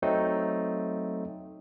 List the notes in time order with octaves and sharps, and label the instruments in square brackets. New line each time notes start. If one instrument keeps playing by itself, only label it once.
[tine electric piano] F#3 A3 C4 D#4